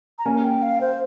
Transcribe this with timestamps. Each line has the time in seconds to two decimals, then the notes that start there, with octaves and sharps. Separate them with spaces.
0.19 A#5
0.26 A#3 C#4 G#5
0.44 G5
0.62 F5
0.81 C5